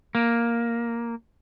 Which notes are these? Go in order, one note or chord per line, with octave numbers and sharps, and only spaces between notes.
A#3